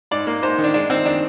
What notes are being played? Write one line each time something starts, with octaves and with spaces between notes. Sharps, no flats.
G#2 D5
A#3
G#2 C5
D#3
D4
G#3 D4
D#3 C4
D#3 D4